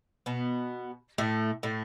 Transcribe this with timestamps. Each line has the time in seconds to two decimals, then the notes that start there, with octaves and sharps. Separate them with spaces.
0.26 B2 B3
1.18 A2 A3
1.63 A2 A3